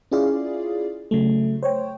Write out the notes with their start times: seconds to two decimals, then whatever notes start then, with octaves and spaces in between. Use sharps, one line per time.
0.11 C#4 E4 F4 G#4 D5 F5
1.11 C#3 F#3 A3
1.63 C5 C#5 G5